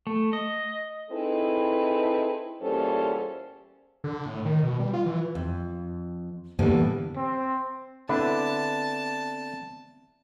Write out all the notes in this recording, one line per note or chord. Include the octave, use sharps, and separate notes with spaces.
A3
D#5
C4 D#4 E4 G#4 A4 B4
E2 A#2 G3 C#4 A4 C5
D3
A2
D#3
B2
G3
F4
E3
F2
A2 D3 E3 G3 A#3 B3
C4
D3 B3 C4 D4 E4 B4 A5